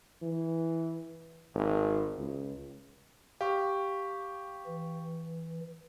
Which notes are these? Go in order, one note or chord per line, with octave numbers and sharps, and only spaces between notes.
E3
G#1
C#2
G4 F5 C#6
E3